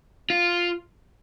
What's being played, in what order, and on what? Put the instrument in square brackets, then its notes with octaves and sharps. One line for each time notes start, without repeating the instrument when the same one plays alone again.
[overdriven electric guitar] F4